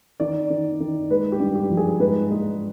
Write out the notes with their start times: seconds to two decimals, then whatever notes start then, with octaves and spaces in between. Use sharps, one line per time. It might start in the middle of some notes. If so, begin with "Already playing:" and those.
0.20 D#3 D5
0.50 D#3
0.80 D#3
1.10 G#3 B4
1.32 G4
1.40 G2
1.55 G4
1.69 F3
1.77 G#4
2.00 G#2 B4
2.30 G#3